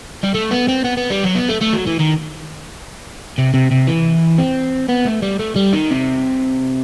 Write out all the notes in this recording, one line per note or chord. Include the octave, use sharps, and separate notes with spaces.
G3
A3
B3
C4
B3
B3
G3
F#3
B3
A3
A3
F#3
E3
D#3
C3
C3
C3
E3
C4
B3
A3
G3
A3
G3
D#3
C3